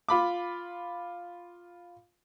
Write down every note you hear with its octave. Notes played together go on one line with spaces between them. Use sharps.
F4 B5 D6